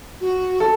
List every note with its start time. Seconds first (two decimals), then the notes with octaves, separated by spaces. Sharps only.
0.21 F#4
0.60 A4